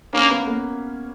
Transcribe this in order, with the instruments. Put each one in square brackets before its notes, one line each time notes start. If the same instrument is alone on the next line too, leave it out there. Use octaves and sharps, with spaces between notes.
[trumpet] A#3 [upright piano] C#4
[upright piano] B3
A#3